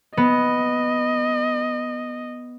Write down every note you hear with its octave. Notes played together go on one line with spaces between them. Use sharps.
B3 D#5